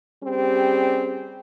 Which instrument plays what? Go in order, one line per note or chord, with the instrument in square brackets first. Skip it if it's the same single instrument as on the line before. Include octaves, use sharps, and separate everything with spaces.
[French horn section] G3 C4 C#4 G4 G#4